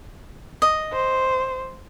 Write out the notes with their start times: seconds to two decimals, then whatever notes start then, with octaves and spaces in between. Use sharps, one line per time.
0.62 D#5
0.93 C5